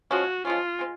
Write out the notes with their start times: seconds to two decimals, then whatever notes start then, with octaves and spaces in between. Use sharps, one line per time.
0.11 F3 G#3 C#4 F#4
0.45 F3 G#3 C#4 F4
0.79 G#3 C4